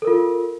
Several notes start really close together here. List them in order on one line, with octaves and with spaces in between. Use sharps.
A4 A#4 F4